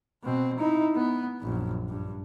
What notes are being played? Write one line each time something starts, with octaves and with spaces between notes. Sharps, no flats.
B2 C4
D#4 E4
B3
A#1 F#2
G2